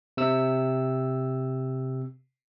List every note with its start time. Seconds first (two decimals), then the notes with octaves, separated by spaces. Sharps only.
0.17 C3 E6